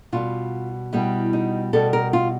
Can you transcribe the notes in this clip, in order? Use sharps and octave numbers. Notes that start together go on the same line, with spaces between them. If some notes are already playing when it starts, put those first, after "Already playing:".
B2 G3 B3 F4
B2 G3 B3 E4
D#4
B2 G3 B3 A4
A#4
F4